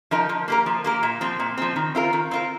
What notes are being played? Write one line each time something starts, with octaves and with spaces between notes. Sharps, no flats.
F3 D#4 A#4
F3
A#3 G4 A#4
F3
A#3 G4 A#4
A#2
F3 C4
A#2
F3 C4
D#3
C4 F4 A#4
D#3
C4 F4 A#4